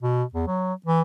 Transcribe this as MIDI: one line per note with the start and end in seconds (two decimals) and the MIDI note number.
0.02 0.23 47
0.33 0.47 40
0.47 0.73 54
0.86 1.01 52